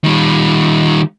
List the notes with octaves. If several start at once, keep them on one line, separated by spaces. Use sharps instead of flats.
D#3 G3